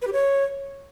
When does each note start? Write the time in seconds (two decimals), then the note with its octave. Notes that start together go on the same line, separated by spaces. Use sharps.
0.02 B4
0.07 G4
0.13 C#5